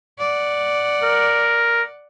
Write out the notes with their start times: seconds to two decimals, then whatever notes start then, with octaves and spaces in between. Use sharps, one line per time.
0.19 D5 F#5
1.03 A#4